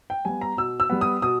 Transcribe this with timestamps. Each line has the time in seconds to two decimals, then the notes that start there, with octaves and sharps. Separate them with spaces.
0.10 G5
0.25 G3 B3 G#5
0.41 A#5
0.57 B2 E6
0.80 E6
0.90 G3 B3
1.01 D#6
1.22 B2 D#6